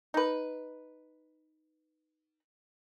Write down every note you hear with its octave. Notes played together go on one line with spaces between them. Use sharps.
D#4 B4